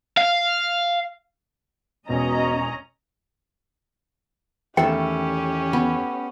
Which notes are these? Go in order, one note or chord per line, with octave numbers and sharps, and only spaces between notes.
F5
E1 B2 C#4 D#5 G#5 A#5
E2 D#3 A3 C#4 G4 A4 G5
B3